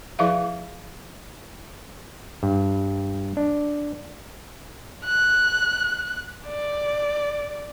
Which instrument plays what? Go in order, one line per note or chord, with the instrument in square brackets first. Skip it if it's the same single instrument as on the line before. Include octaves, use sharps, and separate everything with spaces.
[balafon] F3 E4 G#4 B4 E5 F5
[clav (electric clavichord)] G2
D4
[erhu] F#6
D5